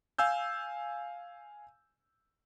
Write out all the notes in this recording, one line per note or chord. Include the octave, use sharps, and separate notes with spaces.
F5 G#5 E6 G6